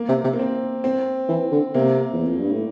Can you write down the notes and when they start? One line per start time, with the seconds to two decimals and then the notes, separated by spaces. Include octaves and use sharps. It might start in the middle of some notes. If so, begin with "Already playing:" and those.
Already playing: A#3
0.09 C3
0.24 C3
0.33 A#3
0.39 C4
0.84 C4
1.29 E3
1.52 D3
1.74 C3 A#3
2.13 E2
2.26 F2
2.39 G2
2.51 A2